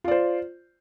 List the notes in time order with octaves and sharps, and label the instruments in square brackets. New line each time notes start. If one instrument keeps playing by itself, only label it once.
[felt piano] F4
D5
C5